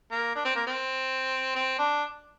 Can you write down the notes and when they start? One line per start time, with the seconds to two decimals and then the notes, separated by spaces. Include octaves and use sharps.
0.11 A#3
0.35 D4
0.45 C4
0.55 A#3
0.67 C4
1.55 C4
1.79 D4